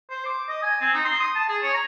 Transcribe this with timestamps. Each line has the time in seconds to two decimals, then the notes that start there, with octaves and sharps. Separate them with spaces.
0.10 C5
0.26 D6
0.49 D#5
0.63 G#5
0.81 C4
0.94 D#4
1.05 C6
1.20 D#6
1.35 A5
1.49 G#4
1.63 C#5
1.74 A#5